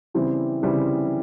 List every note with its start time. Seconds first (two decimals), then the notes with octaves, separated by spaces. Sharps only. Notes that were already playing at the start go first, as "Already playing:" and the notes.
0.14 C#3 E3 G3 C4 E4
0.63 C#3 E3 G3 C4 E4